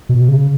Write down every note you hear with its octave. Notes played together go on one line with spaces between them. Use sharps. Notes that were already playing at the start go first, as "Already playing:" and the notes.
B2
C#3